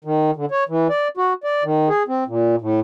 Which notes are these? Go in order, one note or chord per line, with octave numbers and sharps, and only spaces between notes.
D#3
D3
C#5
E3
D5
F#4
D5
D#3
G#4
C4
A#2
A2